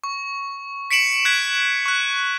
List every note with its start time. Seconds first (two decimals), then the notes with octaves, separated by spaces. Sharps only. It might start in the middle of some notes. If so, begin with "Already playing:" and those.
0.04 C#6
0.91 B6 C#7 D7 E7 F#7
1.25 F#6 G#6 B6
1.86 C#6 F#6